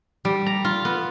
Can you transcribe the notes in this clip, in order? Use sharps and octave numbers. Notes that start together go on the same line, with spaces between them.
G3
A#5
F4
B3